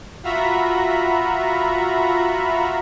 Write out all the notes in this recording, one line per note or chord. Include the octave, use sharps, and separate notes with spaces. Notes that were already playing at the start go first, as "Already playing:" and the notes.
F4 F#4 E5 A#5 B5